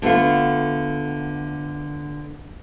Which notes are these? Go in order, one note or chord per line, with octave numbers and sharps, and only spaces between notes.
D3 A3 B3 F4